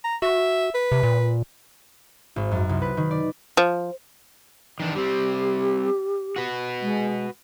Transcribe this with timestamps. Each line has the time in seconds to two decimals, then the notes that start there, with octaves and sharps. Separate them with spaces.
0.04 A#5
0.22 F#4 E5
0.75 B4
0.92 C3
1.03 A#2
2.36 G#1
2.52 F#2
2.69 C2
2.82 B4
2.97 D#3
3.11 D5
3.57 F3
4.80 D#3 E3 D4
4.95 G3 C4 G4
6.36 F#4 B4
6.82 G#3